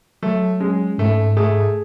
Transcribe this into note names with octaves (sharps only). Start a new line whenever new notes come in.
F#3 A3
G#3 C#4
G#2 A3
A3 G#4